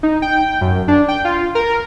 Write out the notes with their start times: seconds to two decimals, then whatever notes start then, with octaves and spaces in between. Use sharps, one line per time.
0.03 D#4
0.22 G5
0.61 F#2
0.88 D4
1.08 G5
1.25 F4
1.55 A#4